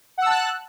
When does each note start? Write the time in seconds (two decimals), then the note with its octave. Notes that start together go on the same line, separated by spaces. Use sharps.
0.18 F#5
0.22 E6
0.26 A5
0.30 F#6